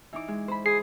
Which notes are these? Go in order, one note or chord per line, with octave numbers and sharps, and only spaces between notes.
E3 D#4 D6
G#3
C5 B5
G#4 C7